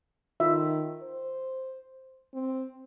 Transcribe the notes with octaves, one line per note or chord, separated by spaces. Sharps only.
D#3 F4 E5
C5
C4